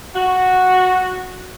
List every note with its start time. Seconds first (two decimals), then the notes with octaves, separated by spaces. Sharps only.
0.15 F#4